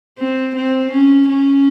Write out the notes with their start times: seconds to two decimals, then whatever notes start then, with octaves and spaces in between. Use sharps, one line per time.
0.18 C4
0.56 C4
0.92 C#4
1.29 C#4